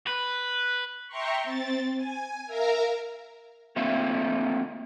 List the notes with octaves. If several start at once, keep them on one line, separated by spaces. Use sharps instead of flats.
B4
E5 G5 A#5 C6 C#6
C4 A6
G#5
A#4 E5 F5 A#5
A3 A#3 C4 F4 E5 F5